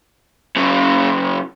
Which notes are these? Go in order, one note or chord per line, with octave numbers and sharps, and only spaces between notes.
F#2 C#3